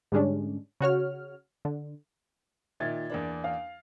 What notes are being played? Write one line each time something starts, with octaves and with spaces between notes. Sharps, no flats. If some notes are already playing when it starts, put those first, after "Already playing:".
G#2 D3 G3 G#3 C#4 D4
C#3 F#4 C#5 F6
D3
A#2 D#3 E5 G#6 A6
E2 A#3 D4
F5